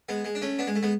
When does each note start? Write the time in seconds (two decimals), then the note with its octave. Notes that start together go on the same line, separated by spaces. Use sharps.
0.09 G#3 B3
0.25 G#3
0.35 D4
0.42 A3 C#4
0.59 B3 D4
0.67 G#3
0.76 A3
0.83 G#3 B3